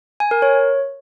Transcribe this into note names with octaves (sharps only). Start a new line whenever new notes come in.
G#5
A#4
C#5